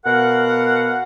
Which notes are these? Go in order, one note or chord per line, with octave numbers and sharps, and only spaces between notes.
B2 A#4 F5 F#5